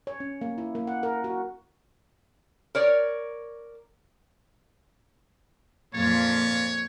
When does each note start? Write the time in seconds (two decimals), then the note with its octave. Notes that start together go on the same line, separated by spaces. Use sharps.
0.07 C#5
0.20 C#4
0.41 A#3
0.58 E4
0.75 A#3
0.87 F#5
1.03 A#4
1.24 F#4
2.75 A#4 C#5 D5
5.95 F2 A#2 C#5 A6